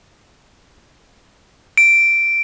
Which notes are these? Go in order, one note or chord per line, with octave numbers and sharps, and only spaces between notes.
D7